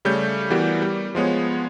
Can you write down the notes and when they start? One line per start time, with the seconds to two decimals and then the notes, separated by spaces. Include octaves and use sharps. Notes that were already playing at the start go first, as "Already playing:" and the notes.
0.05 C#3 G3 A3 C#5 G6
0.50 E3 G3 B3 F#4 G4 A#4
0.82 G3
1.15 F3 G#3 B3 C#5